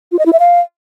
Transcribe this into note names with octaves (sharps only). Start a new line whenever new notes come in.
F4
D#5
E4
E5
F5